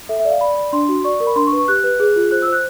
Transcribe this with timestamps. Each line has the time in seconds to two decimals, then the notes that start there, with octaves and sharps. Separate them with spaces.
0.09 A4 E5
0.20 E5
0.25 D5
0.30 F5
0.41 D5 B5
0.57 D5
0.73 D4 C6
0.88 F#4
1.04 D5 C#6
1.20 A#4
1.27 B5
1.36 D4 C6
1.47 C#6
1.52 B4
1.58 C#6
1.68 G4 F#6
1.84 B4
2.00 G#4
2.16 F4
2.31 C5 F#6
2.42 E6
2.48 C5 F#6